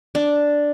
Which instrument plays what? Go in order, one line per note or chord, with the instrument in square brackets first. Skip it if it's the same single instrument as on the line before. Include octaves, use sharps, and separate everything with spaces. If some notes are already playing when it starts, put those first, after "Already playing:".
[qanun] D4